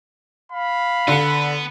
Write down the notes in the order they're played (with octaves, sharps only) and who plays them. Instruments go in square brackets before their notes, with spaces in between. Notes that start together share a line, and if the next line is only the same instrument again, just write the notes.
[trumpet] F5 [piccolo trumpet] B5
[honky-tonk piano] D3 C#7 [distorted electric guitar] B3